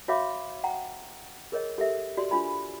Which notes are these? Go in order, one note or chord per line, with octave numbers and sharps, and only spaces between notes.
F#4 C#5 E5 F5 B5 D6
F#5 G5 A#5
G#4 A#4 C#5 D#5
G4 A4 A#4 E5
F#4 G4 D5 C6
D4 F4 G#5 B5